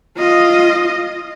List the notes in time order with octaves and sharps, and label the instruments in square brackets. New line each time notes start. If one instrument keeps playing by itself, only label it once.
[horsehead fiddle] F4 D#5